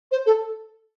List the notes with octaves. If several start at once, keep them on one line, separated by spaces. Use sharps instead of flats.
C5
A4